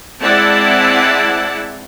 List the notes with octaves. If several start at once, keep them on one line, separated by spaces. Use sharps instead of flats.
G#3 C4 E4 D5 F#5 A5